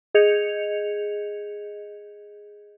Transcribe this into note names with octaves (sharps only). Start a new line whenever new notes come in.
G#4 D#5 G6 G#6 C#7 F7